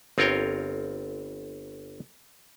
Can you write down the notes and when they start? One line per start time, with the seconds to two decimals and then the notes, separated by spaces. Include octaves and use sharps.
0.18 G1 C4 F4 A#4 C#5 G5